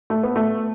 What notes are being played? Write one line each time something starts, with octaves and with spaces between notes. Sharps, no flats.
A3
B3
A3